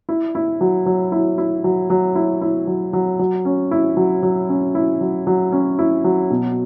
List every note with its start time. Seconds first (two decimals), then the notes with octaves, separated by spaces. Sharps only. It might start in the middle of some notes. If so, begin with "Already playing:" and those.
0.09 E4
0.35 E4
0.61 F#3
0.86 F#3
1.12 E4
1.38 E4
1.64 F#3
1.90 F#3
2.15 E4
2.41 E4
2.67 F#3
2.93 F#3
3.19 F#3
3.45 C#4
3.71 E4
3.97 F#3
4.23 F#3
4.49 C#4
4.75 E4
5.01 F#3
5.27 F#3
5.52 C#4
5.79 E4
6.04 F#3
6.30 B2